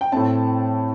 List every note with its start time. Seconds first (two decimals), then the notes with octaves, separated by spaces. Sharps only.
0.01 G5
0.12 A2 A3 C4 A5